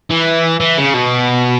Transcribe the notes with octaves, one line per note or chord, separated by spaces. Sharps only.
E3
E3
C#3
B2